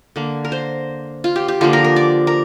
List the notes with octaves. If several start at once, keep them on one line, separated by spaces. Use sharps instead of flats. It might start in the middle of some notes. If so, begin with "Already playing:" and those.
D3 A#3
A#4
C5
F4
G4
G4
D3 F3 A#3 F4
A#4
A#4
D5
A#4